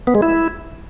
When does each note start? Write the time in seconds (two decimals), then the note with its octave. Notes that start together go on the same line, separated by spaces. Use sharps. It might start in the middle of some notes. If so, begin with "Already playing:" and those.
0.07 B3
0.15 G#3
0.22 E4